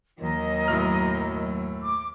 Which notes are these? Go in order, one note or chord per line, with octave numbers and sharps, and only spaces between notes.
D#2 F#3 A#4 D#5
F#2 A2 F6
D6